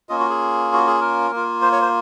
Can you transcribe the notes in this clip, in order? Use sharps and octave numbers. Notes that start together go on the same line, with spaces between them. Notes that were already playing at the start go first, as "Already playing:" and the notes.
A#3 C#4 F4 D#5
F#4
G#4
F#4
G#4
A#4
A#3 F4
C5
C#5
C5